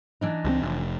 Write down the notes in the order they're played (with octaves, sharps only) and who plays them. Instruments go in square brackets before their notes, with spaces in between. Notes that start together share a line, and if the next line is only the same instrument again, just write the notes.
[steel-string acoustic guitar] E3 D4 D#4
[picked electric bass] C#2 F3 C4
F1